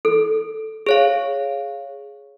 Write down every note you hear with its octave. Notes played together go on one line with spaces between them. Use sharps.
A4
G#4 C#5 F5